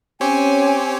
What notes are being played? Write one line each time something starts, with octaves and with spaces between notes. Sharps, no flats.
C4 C#4 G4 C#5 G#5